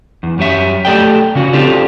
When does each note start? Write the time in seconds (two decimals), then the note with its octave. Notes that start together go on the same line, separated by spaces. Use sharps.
0.23 E2
0.38 F#2 G3 C#4 E5
0.85 A3 G4 A4 D5 D#5 G5
1.35 C#3 C#4 F#4
1.53 C4 D4 F4 G4 A4 D5